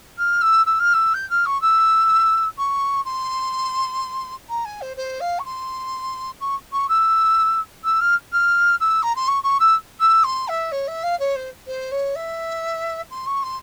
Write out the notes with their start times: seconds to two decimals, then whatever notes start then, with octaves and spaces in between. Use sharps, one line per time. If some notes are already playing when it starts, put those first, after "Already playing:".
0.18 F6
0.42 E6
0.66 E6
0.79 F6
0.94 E6
1.14 G6
1.30 F6
1.46 C#6
1.62 E6
2.58 C#6
3.05 C6
4.49 A#5
4.65 G#5
4.81 C5
4.97 C5
5.21 F5
5.39 C#6
5.45 C6
6.41 C#6
6.72 C#6
6.89 E6
7.84 E6
8.01 F6
8.32 F6
8.80 E6
9.03 A#5
9.16 C6
9.28 C#6
9.43 C#6
9.60 E6
10.00 E6
10.24 C6
10.48 E5
10.72 C#5
10.88 E5
11.03 F5
11.19 C#5
11.36 C5
11.67 C5
11.92 C#5
12.15 E5
13.11 C6
13.27 C#6
13.43 C6